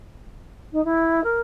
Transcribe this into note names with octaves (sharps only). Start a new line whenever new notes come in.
D#4
E4
A#4